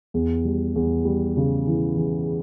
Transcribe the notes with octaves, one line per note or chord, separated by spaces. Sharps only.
E2
G3
E2
G3
C#3
E3
E3